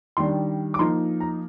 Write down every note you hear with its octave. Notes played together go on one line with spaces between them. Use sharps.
D#3 G3 D4 C6
D6
F3 A#3 D#4 C6
A#5